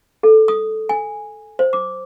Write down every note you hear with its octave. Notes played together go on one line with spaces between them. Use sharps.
A4
D#6
G#5
C5
D6